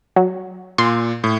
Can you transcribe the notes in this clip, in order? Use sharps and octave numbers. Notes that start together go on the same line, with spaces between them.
F#3
A#2 C6
A2